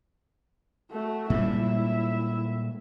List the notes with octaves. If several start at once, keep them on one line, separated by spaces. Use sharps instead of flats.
A3 F#4
A#2 G3 G#3 E4 E5